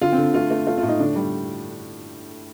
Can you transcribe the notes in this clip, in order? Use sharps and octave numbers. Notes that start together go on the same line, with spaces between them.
D3 F4
C4
D3
A3 F4
A3
A3 F4
F4
A2
D#4
D3 D4
G3